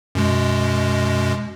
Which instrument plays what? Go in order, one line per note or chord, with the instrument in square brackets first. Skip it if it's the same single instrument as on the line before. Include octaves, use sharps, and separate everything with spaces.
[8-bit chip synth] F#2 B2 G#3